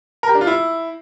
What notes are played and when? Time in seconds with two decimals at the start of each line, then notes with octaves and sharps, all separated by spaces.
0.23 A#4
0.29 G4
0.35 D4
0.41 F4
0.47 E4